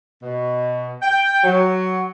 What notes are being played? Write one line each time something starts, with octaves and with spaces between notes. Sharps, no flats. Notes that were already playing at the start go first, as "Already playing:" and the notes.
B2
G5
F#3